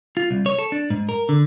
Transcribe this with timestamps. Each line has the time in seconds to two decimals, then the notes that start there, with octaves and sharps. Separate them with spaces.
0.17 F4
0.31 C2
0.46 C#5
0.59 A4
0.72 D4
0.90 G#2
1.09 A#4
1.29 D3